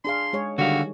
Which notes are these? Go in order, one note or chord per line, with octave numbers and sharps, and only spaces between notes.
D4 G#4 F5 C6
G#3 G#4 C#5
D3 D#3 G3 F#4 G4 F5